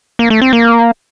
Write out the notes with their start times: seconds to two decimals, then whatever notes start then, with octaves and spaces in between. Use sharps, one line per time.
0.19 A#3
0.30 A3
0.42 C4
0.53 A#3